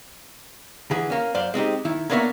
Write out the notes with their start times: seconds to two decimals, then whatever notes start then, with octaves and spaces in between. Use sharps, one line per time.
0.91 D3 E3 G#4
1.10 A#3 C#4
1.34 F#2 C5 D5 F5
1.54 G#3 C4 D#4 G4
1.85 D#3 E4
2.10 A#3 B3 D4 A#4 C#5 E5